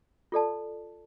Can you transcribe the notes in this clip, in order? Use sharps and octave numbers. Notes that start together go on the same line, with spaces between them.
F4 A4 D5 A5